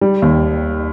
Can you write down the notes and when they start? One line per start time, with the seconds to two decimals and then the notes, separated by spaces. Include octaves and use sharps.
0.02 G3
0.22 D#2